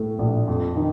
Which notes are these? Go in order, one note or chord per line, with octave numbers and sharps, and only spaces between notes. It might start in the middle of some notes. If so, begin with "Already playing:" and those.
Already playing: A2 A3
A#1
F2
D#3